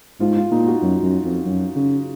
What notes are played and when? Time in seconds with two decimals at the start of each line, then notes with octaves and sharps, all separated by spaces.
0.20 G#2 F4
0.36 F4
0.51 A#2 D#4
0.67 F#4
0.82 F#2
1.03 F#2
1.25 F2
1.45 F#2
1.76 C#3